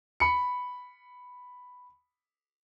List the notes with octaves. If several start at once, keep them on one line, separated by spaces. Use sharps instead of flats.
B5 C#7